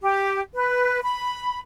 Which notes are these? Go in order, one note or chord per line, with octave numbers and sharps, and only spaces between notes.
G4
B4
B5